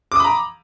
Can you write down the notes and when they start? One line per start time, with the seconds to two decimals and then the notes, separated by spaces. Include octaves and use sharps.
0.12 D6
0.16 D#6
0.20 B5
0.24 A#5